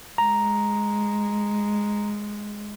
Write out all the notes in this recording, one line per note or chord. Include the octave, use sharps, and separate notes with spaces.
G#3 A#5